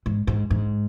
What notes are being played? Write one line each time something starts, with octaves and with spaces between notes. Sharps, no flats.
G#2
G#2
G#2